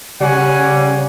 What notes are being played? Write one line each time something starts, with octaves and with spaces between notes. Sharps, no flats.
C#3 G3 C#5 F#5 G#5